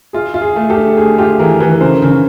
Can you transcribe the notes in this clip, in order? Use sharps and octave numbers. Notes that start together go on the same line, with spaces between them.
F4 G#4
F4
G#4
A3
G4 A4
D4
A3 G#4
F4 G4 A4
E3 G#4 A#4
E3 A4 B4
C#3 A#4 C5
C#3